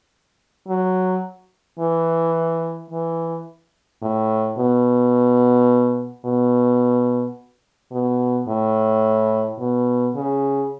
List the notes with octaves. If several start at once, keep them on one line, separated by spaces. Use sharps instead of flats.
F#3
E3
E3
A2
B2
B2
B2
A2
B2
C#3